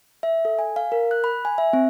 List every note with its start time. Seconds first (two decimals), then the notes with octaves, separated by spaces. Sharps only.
0.23 E5
0.45 A4
0.59 G#5
0.76 F5
0.92 A#4
1.11 F#6
1.24 B5
1.45 G#5
1.58 E5
1.73 C4